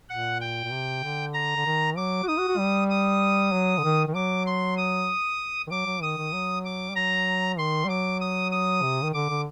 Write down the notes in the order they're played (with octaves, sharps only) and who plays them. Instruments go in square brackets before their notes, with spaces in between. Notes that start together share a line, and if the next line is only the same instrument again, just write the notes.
[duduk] A#2 [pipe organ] F#5
[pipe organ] G5
[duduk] A#2
C3
D3
[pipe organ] A#5
[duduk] D3
D#3
[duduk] F#3 [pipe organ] D6
[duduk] F#4
[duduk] D#4 [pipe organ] D#6
[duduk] F#4
F#4
G3
[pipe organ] D#6
[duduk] F#3
D3
D#3
D#3
[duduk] F#3 [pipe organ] D6
[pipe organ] C6
D#6
[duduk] D#3
[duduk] F#3 [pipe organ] D6
[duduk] F#3
[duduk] D#3 [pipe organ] D#6
[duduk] D#3
F#3
[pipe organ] D6
[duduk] G3
[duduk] F#3 [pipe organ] A#5
[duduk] D#3 [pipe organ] C6
[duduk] G3
[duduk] F#3 [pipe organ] D6
[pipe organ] D#6
D#6
[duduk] C3
D#3
[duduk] D3 [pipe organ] D6
[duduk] D3